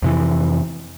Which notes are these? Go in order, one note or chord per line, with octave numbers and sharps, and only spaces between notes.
F2 C3 E3